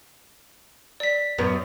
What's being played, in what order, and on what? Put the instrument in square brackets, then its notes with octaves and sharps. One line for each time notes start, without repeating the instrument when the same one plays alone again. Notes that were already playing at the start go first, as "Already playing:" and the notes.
[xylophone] D5 B6
[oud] F#2 B3